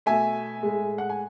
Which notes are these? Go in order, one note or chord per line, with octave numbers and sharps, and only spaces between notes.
B2 A3 E5 G#5
A2 G#3
F#5
G#5